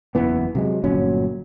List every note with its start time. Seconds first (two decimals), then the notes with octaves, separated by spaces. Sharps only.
0.15 F#1 E2 E3 B3
0.55 C3 F#3 G#3
0.84 G1 A#2 F#3 C#4